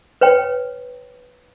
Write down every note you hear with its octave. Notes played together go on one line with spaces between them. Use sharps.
B4 C#5 G5